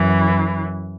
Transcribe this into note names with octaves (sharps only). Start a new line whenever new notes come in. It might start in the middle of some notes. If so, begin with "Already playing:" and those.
Already playing: F#2 E3